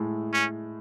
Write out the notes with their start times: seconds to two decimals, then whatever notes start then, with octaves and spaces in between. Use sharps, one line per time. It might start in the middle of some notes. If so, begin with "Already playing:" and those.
Already playing: A2 G#3 A3
0.33 C#4